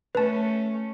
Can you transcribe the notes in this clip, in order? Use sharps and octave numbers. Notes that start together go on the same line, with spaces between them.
A3 C#4 B4 A5